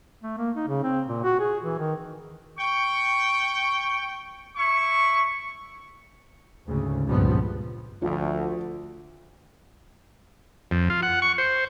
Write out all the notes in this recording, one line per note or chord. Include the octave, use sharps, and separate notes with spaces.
A3
A#3
D#4
C#3
C4
A#2
F#4
G#4
E3
D#3
G5 C#6
E4 C#6
D2 G#2 C#3
C#2 G2 A#2 F3 G3 B3
D2 F3
F2
F4
F#5
C#6
C5